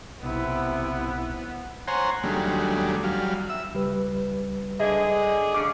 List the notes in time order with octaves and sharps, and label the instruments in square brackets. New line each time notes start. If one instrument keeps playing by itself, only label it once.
[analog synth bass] B1 [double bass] C3 E4 [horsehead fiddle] B3
[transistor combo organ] C5 C#5 F#5 G#5 A#5 C6
D#2 F#3 G3 A3 D4 G#4
F#3 G3 F5
E5 E6
[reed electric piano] C#2 G3 B4
[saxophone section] D3 G#4 [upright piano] D#5
[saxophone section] G2 C#3 D4 [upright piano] D6